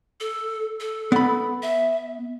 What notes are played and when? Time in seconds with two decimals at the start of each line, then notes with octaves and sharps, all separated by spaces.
0.20 A4
0.80 A4
1.12 B3 B5
1.62 E5